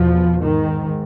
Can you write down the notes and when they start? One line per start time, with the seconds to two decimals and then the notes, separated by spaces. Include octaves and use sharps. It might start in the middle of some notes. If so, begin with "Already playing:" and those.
Already playing: E2 B2 F3
0.42 G#2 D#3